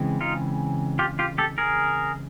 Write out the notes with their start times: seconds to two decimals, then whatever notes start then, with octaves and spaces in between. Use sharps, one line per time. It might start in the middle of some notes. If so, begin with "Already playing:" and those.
Already playing: C#3 E3 G#3 C4
0.21 D#4 F4
0.99 F4 G4
1.19 F4 G4
1.38 G4 A4
1.58 G#4 A#4